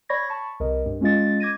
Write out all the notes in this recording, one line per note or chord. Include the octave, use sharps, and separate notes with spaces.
C#5 D5 B5 C#6 G#6 A#6
A5 B5 C#6
C2 A#4 D#5
G2
G#3 C#4 F4 D#5 A6
D6 G#6 A#6 D#7